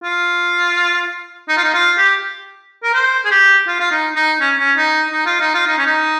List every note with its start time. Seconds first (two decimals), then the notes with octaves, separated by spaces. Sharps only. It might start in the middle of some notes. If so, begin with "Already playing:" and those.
0.04 F4
1.49 D#4
1.57 F4
1.64 D#4
1.74 F4
1.98 G4
2.84 A#4
2.94 C5
3.25 G#4
3.31 G4
3.68 F4
3.80 F4
3.92 D#4
4.16 D#4
4.40 C#4
4.59 C#4
4.77 D#4
5.13 D#4
5.26 F4
5.41 D#4
5.54 F4
5.67 D#4
5.78 C#4
5.86 D#4